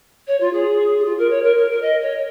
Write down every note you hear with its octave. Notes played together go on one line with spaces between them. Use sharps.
C#5
F4
G#4
G#4
F4
A#4
C#5
A#4
A#4
A#4
D#5
C#5